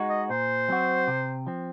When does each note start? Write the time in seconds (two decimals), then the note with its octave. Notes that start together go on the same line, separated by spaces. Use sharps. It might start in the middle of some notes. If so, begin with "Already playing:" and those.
Already playing: G#3 D#4 F#4
0.09 D#5
0.30 A#2 C5
0.68 F#3 C4 F#4
1.08 C3
1.47 F3 C4